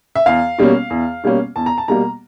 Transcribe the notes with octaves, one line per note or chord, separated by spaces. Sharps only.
E5
E2 F5
B2 G3 A#3 C#4
E2
B2 G3 A#3 C#4
E2 A5
A#5
A5
B2 G3 A#3 A#5